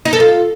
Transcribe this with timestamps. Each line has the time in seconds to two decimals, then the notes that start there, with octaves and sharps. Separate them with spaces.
0.05 D#4
0.13 A4
0.20 F4